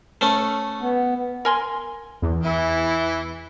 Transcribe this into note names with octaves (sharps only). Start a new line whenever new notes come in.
A3 C#4
B3
A#4 G#5 C6
E2
E3 E4